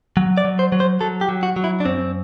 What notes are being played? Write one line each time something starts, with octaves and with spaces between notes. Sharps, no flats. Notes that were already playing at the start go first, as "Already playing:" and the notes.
F#3
D5
F#3
C5
F#3
C5
F#3 A4
G4
F#3
F#4
F#3
E4
D4
F#2 C4